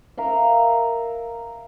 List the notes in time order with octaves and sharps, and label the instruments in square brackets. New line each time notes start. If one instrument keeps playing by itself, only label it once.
[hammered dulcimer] A#4 E5 F5